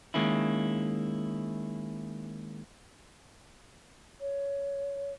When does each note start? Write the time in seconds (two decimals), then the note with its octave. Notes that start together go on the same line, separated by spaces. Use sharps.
0.14 D#3 G#3 A#3 C#4 E4
4.20 C#5